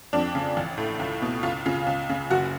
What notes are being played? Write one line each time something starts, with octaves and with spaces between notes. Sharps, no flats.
F2 D4
C#3
A1
A2
C#2
B2
C#2 F4
C#3 F4
C#2
C#3
F#1 F#4